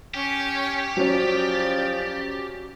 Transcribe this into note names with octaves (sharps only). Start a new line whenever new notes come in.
C#4 G4
F3 F#3 C#4 D5